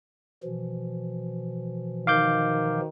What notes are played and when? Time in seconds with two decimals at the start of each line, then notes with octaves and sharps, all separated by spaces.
0.44 B2 E3 F3
2.07 D#3 F5 D6 G6